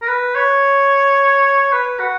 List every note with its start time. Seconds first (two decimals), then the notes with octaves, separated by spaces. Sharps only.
0.02 A#4
0.07 B4
0.35 C#5
1.72 B4
1.99 F#4